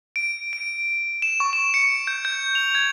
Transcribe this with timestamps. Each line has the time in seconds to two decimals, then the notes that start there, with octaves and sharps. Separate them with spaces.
0.16 D7
0.53 D7
1.22 E7
1.40 C#6
1.53 E7
1.74 C#7
2.07 G6
2.25 G6
2.55 F7
2.75 G#6